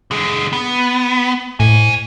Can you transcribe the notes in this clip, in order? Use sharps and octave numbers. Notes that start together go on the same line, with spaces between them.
D3 G#4
B3
A2 C5 G#5